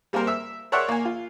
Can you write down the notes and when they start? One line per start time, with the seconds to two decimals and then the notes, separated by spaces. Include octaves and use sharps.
0.13 G3 A#3 C4 A#4 C5
0.27 E5 E6
0.72 A#4 C#5 D5 E5 F#5 C6
0.89 A#3 G#5
1.05 F4